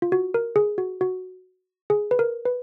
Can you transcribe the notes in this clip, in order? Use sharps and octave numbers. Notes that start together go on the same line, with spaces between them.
F4
F#4
A#4
G#4
F#4
F#4
G#4
B4
A#4
B4